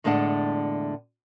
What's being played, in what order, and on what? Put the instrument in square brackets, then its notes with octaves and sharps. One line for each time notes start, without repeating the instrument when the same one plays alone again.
[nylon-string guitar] E2 A2 D3 G#3 D4 F#5